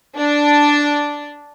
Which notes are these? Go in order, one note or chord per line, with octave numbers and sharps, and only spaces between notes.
D4